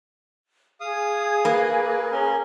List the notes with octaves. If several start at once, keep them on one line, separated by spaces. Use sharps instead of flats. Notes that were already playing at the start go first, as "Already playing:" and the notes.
G#4 F5 D#6
A#3 B4
C#4 A#4